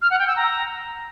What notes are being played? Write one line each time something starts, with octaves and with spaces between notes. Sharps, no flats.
F6
F#5
G5
E6
A#5